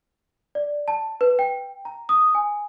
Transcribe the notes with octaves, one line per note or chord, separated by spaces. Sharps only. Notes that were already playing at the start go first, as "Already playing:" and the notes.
D5
A5
B4
G5
A#5
D#6
G#5